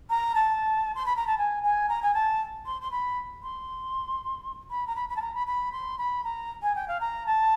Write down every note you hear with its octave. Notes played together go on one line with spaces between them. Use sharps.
A#5
A5
C6
B5
A#5
A5
G#5
G#5
A#5
G#5
A5
C6
C6
B5
C6
B5
A#5
B5
B5
A5
A#5
B5
B5
C6
B5
A#5
G#5
G5
F5
A#5
A5